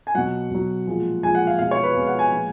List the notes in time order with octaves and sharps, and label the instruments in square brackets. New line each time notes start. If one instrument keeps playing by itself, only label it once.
[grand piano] G#5
B2 F#3 F#5
B2 F#3
A#2 F3 G#3
A#2 F3 G#3 G#5
F#5
F5
B2 G#3 F5
C#5
B4
B2 G#3
F#5
G#5
A#2 F3 G#3